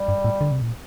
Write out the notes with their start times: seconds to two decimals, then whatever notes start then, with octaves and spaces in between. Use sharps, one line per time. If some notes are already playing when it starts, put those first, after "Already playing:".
Already playing: G3
0.08 G2
0.25 A2
0.41 D3
0.51 C3
0.62 A#2